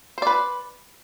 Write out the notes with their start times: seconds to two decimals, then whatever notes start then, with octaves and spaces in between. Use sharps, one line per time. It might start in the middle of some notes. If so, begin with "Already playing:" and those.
0.18 C5
0.22 D5
0.27 B4